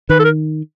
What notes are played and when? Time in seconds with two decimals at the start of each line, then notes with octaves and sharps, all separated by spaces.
0.09 D#3 B4
0.19 A4
0.24 A#4